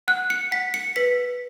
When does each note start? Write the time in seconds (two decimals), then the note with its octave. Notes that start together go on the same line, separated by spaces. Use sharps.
0.08 F#5 F#6
0.30 C#7
0.52 F#5 B6
0.74 C#7
0.96 B4 B6